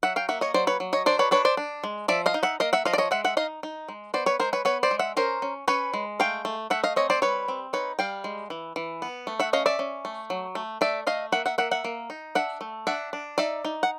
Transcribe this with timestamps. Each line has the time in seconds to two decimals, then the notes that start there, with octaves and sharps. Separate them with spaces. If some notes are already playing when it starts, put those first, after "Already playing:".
0.03 F#3 E5 F#5
0.16 F5 G5
0.29 A#3 E5 F#5
0.41 C#5 D#5
0.54 F#3 C5 D5
0.67 B4 C#5
0.80 F#3
0.93 C#5 D#5
1.06 D4 C5 D5
1.19 B4 C#5
1.31 D4 B4 C#5
1.45 C5 D5
1.57 D4
1.84 G#3
2.08 F3 D5 E5
2.26 D#5 F5
2.34 D#4
2.43 E5 F#5
2.60 A#3 D#5 F5
2.73 E5 F#5
2.85 F3 D#5 F5
2.93 D5
2.98 C#5 D#5
3.11 G#3 E5 F#5
3.24 E5 F#5
3.37 D#4 D#5 F5
3.63 D#4
3.88 G#3
4.14 B3 C5 D5
4.26 B4 C#5
4.40 G#3 A#4 C5
4.53 B4 C#5
4.65 B3 B4 C#5
4.83 C5 D5
4.91 G#3
4.99 E5 F#5
5.17 C#4 A#4 C5
5.42 C#4
5.68 C#4 B4 C#5
5.94 G#3
6.20 A3 F5 G5
6.45 A3
6.70 A3 E5 F#5
6.84 D#5 F5
6.96 C4 C#5 D#5
7.10 C5 D5
7.22 G3 B4 C#5
7.48 C4
7.73 D#4 B4 C#5
7.99 G3 F5 G5
8.24 G#3
8.50 E3
8.76 E3
9.02 B3
9.27 A3
9.40 E5 F#5
9.53 C#4 D#5 F5
9.66 D5 E5
9.79 C#4
10.05 A3
10.30 F#3
10.55 A3
10.81 A3 D5 E5
11.07 A3 D#5 F5
11.32 A#3 E5 F#5
11.46 E5 F#5
11.58 A#3 E5 F#5
11.71 E5 F#5
11.84 A#3
12.10 D#4
12.35 D4 E5 F#5
12.61 A3
12.87 D4 E5 F#5
13.13 D4
13.38 D#4 D5 E5
13.65 D#4
13.83 F#5